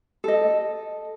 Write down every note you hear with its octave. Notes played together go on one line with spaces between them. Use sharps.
A4 D#5